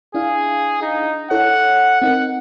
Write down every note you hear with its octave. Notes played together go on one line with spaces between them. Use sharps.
D4 E4 G#4 F5
D#4
E4 A4 C#5 F#5
C4 D#4 A#4 F#5